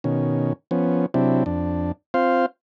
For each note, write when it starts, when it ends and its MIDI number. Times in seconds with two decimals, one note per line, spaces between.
0.04 0.53 47
0.04 0.53 51
0.04 0.53 61
0.71 1.06 53
0.71 1.06 59
0.71 1.06 61
1.14 1.44 48
1.14 1.44 54
1.14 1.44 60
1.14 1.44 62
1.14 1.44 64
1.46 1.92 41
1.46 1.92 62
2.14 2.46 60
2.14 2.46 65
2.14 2.46 72
2.14 2.46 77